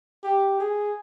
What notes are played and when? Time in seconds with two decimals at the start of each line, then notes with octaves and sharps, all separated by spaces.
0.24 G4
0.60 G#4